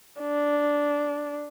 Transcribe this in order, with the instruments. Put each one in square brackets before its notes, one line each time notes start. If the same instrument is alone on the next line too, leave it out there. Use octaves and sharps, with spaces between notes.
[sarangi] D4